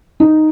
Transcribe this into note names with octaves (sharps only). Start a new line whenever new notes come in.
D#4